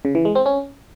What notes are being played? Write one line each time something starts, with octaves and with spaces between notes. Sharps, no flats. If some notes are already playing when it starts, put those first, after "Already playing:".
C#3
E3
G#3
C4
C#4